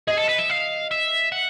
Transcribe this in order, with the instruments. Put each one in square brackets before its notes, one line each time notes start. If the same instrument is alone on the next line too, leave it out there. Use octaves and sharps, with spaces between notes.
[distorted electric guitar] G#4 [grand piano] D#5
[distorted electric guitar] A4
B4
E5
F5
E5
F#5